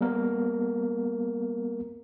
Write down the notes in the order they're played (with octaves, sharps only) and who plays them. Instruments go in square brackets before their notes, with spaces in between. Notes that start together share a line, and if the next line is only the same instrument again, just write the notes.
[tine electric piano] G3 A#3 B3 A#4